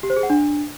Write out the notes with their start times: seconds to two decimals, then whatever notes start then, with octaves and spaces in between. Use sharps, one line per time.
0.03 G4
0.10 C5
0.16 G#4
0.23 F#5
0.30 D4